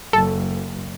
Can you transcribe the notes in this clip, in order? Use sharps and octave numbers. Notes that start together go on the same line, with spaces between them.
F#1 A4